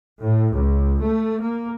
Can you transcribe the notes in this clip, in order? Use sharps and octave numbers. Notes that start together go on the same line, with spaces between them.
A2
C#2
A3
A#3